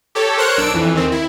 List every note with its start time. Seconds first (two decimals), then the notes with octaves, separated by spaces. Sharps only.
0.15 G4 A4 C#5
0.38 A#4 C5 C#5 F#6 C#7
0.58 B1 D4 E6 D7
0.74 F2 E3
0.94 D#2 D#3 C4
1.12 E4